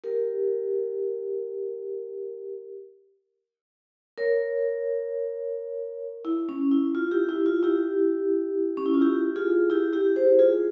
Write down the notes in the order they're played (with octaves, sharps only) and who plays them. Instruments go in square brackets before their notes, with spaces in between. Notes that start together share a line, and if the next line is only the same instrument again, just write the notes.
[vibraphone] G4 A#4
A#4 C#5
E4
C#4
E4
F4
E4 G4
E4
F4
E4 G4
C#4
E4
F4
E4 G4
F4 G#4
E4 G4
E4 G4
G#4 C5
F4 G#4